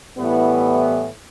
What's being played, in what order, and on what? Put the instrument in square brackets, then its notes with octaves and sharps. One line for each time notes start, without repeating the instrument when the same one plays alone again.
[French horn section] A2 E3 G3 B3